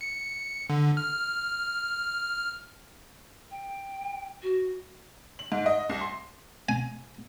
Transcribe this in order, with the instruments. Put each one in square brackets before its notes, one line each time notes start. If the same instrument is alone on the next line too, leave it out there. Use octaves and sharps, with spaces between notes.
[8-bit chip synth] C#7
D3
F6
[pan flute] G5
F#4
[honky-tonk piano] F#7
G#2
D#5
C2
C6
[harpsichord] G#5